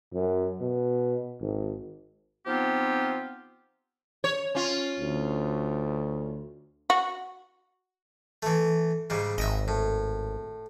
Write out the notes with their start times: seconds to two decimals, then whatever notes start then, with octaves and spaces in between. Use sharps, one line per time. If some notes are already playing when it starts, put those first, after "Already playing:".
0.14 F#2
0.61 B2
1.41 G#1
2.46 F3 B3 C4 D#4 F4 G4
4.24 C#5
4.55 C#4 F4
4.99 D2
6.90 F#4
8.43 E3 A3
9.10 G#2 C#3 G3
9.38 G#1 D#5 E5
9.68 A2